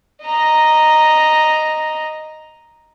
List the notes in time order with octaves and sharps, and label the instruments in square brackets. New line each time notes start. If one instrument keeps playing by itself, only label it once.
[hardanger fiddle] D#5 A#5